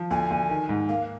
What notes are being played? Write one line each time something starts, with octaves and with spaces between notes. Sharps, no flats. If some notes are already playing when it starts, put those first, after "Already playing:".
Already playing: F3
D2 G#5
D2
D#3
G#2
A#3 F5